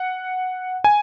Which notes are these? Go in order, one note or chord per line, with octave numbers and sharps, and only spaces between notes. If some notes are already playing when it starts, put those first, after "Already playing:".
Already playing: F#5
G#5